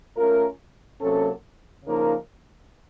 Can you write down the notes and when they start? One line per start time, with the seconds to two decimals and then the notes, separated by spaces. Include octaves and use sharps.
0.17 A3 C#4 F4 A#4
1.01 C3 F#3 A#3 C#4 A4
1.85 C#3 F3 A#3 D#4 A#4